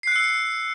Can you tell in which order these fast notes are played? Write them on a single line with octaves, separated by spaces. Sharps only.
C7 F#6 C#7 E6